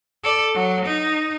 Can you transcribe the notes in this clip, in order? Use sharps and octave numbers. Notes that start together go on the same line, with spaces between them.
A4 D5
F#3
D#4